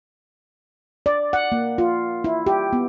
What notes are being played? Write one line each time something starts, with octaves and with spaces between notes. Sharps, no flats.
D5
F#5
A#3
F4
E4
G4
B3